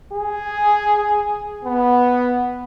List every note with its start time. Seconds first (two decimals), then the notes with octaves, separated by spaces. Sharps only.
0.12 G#4
1.65 B3